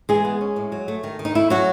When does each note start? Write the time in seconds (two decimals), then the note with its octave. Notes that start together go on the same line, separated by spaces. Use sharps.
0.09 E3 G#3 G#4
0.25 B3
0.41 C#4
0.56 A2
0.72 F#3
0.88 A3
1.03 D#3
1.19 D#3
1.25 D#4
1.35 A3 E4
1.50 F#3 C#4 F#4